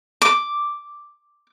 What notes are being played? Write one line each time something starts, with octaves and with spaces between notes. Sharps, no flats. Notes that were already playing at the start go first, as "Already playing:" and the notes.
D6